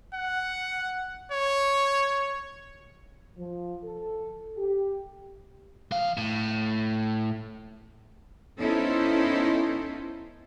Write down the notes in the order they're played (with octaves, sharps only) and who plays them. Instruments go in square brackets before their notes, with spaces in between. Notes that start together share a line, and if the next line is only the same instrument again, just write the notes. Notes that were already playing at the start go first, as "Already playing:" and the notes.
[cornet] F#5
C#5
[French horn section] F3
A4
G4
[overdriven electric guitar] E3 F5
A2
[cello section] B3 C#4 D#4 E4 A4 C5